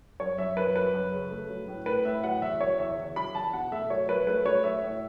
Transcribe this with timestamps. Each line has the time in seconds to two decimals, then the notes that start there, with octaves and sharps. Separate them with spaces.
0.20 F#2 C#5
0.38 F#2 E5
0.57 F#2 B4
0.75 F#3 B4
0.94 F#2
1.12 C#3
1.31 A3
1.50 F#3
1.68 A2
1.86 A3 B4
2.05 A2 E5
2.24 F#3 F#5
2.42 E2 E5
2.61 F#3 C#5
2.79 E2 E5
2.98 E2
3.16 F#3 B5
3.34 E2 A5
3.53 B2 F#5
3.71 A3 E5
3.90 F#3 C#5
4.08 F#3 B4
4.27 A3 B4
4.46 F#3 C#5
4.64 A3 E5
4.83 A2